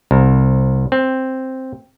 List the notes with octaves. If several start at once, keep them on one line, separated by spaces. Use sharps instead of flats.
C2
C4